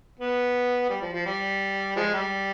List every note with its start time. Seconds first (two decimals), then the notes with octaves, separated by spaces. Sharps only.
0.20 B3
0.90 G3
1.02 F3
1.14 F3
1.26 G3
1.96 F3 G#3
2.14 G3